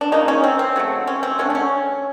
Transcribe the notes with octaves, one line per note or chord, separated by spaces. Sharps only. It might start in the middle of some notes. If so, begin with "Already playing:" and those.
D4
C#3 F3 A#3 D#4
C#4
C4
C4
C#3 F#3 A3
C#4
C4
D3 F#3 A3 C#4
D4
C#4